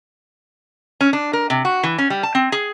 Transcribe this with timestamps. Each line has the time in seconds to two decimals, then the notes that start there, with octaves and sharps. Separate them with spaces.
1.01 C#4
1.13 D4
1.33 A#4
1.50 C3
1.65 F#4
1.83 E3
1.98 C#4
2.10 G3
2.23 A5
2.35 C4
2.52 G#4